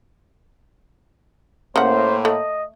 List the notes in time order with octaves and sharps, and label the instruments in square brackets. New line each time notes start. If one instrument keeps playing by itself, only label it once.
[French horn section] A2 A#3 [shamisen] C#3 F#5 [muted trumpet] C5
[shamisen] A3 [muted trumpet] D#5